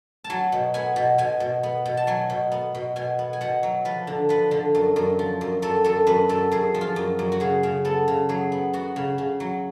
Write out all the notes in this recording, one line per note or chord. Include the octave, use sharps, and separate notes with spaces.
A5
F#3 G#5
B2
B3 G#5
B2
B2 G#5
B2
B3
B2
A5
F#3 G#5
B2
B3
B2
B2 G#5
B3
G#5
B2 F#5
F#3
F3 B4
D3
F3 B4
D3
F#2
F#2
F3
F#2
F#2 A4
F#2 A4
F#2 B4
F#2 A4
F#2 G#4
F3
F4
F#2
F#2
F#4
C#3 G#4
C#3
B3 A4
C#3
F#3 G#4
B3
B3 F#4
C#3
C#3
F#3